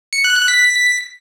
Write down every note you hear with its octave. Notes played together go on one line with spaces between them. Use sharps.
C#7
F#6
F#6
B6